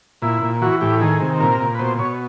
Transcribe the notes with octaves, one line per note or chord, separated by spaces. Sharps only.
A#2 E4
A#2
E3 F#4
A2 G4
D#3 G#4
C3
A#2 A#4
A#2
B4
B2 C5
B2 C#5